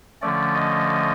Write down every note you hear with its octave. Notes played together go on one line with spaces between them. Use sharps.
D3 F3 A3 C#4 D5
D#5